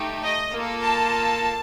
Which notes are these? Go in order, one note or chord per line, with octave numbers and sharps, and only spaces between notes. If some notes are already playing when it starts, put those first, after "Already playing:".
Already playing: A3 D#4 G4
D#5
A#3 F4 A4
A5